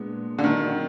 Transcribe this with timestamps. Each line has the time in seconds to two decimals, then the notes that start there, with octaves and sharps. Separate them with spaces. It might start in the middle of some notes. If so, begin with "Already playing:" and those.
Already playing: A#2 G#3 B3 D4
0.39 D3
0.44 A#2 D#3 F#3 D4